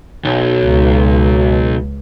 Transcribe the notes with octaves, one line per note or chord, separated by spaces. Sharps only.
B1
C#2